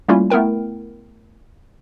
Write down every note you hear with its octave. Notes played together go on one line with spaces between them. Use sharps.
G3 A3 A#3 C#4 E4 F4
A3 B3 E4 A#4 G5